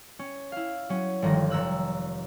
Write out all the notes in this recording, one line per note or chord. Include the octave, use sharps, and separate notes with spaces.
C#4
E4 F5
F#3 C#4
G1 D#3 F3 A#6
F1 A#5 E6 F#6